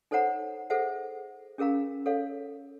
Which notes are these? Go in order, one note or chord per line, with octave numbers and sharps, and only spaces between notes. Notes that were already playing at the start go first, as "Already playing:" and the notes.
D#4 A4 C5 C#5 F#5 A#5
G#4 A4 C5 E5 F#5
C#4 G#4 A#4 F5 A#5
A4 C#5 F5